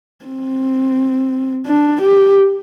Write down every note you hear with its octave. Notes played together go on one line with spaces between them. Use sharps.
C4
D4
G4